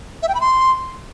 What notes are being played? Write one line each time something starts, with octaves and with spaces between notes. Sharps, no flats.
E5
G5
B5
C6